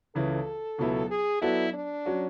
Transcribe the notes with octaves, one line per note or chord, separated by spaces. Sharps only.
C#2 C#3 E3 A4
C#2 B2 F#3 B3 E4
G#4
F#3 B3 E4 F#4 A4 D5
D4
F#3 C#4 F#4